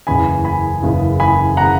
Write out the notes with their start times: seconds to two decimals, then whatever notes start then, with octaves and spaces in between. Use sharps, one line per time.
0.07 F#1 E2 C#3 G#5 B5
0.45 G#5 B5
0.82 F#1 E2 C#3
1.20 G#5 B5
1.57 C#3 F#5 A#5